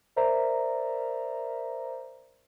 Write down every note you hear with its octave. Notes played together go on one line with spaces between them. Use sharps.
A#4 C5 D5 E5 A#5